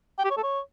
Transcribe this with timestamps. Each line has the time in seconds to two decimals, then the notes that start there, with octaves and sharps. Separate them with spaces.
0.18 G5
0.24 G4
0.31 C#5
0.37 A4
0.43 C#5